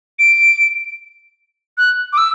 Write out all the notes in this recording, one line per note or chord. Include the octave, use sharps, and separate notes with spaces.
D7
F#6
D6
E6